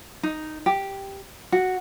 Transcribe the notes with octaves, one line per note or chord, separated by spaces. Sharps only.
D#4
G4
F#4